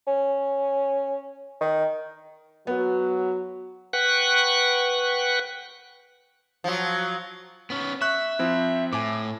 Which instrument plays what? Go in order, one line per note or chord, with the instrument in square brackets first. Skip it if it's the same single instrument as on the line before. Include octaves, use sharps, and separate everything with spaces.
[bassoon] C#4
D#3
[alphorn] F#3 [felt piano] B3
[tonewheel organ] B4 F#5 G5 C#6 F#6
[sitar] F3 F#3
[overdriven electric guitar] B3 C#4
[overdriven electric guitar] E5 [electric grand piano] C#6 F#6
[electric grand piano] F3 C4 E4
[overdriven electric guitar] A2 [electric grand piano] G#5 D6